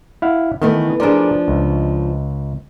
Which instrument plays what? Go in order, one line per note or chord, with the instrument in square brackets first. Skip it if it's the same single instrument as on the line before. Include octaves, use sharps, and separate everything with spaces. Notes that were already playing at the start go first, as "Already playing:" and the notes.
[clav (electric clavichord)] E4 F5 F#5
[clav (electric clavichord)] D#3 [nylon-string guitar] E3 A3 B3
[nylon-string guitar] F3 D4 [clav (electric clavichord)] G#4 A#4 D5
[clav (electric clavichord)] C#2